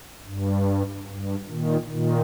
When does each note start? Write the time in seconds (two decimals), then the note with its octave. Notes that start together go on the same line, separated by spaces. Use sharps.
0.26 G2
1.07 G2
1.48 A#2 D#3
1.89 A#2 D#3